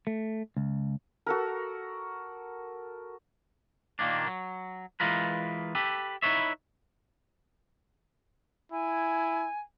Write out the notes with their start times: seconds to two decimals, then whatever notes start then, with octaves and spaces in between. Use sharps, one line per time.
0.07 A3
0.57 C#2
1.26 F#4 A4 A#4
3.99 A#2 D#3 A#3 D4
4.27 F#3
5.00 E3 G#3 F4 A#4 B4
5.75 G4 A4 B4
6.22 D#4 E4 B4 C#5 E5
8.72 E4 G#5